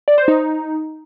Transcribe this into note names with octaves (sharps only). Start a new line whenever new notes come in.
D5
C5
D#4